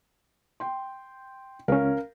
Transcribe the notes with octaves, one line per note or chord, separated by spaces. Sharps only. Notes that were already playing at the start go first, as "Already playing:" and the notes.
G5 C6
C#2 C#4 A#4 F5